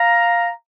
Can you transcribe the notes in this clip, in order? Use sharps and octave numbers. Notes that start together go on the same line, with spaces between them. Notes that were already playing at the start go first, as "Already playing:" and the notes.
Already playing: F5 A#5